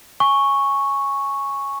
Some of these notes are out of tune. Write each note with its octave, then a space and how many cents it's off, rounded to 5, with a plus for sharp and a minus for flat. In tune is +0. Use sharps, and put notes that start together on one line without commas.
G#5 +0 C#6 -5